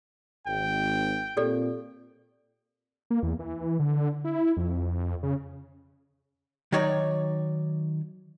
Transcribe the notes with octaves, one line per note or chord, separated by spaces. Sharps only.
G#1 G5
A#2 C4 G4 A4 D5
A#3
E2
E3
D3
E4
F2
C#3
D#3 F#3 D#4 C#5 D5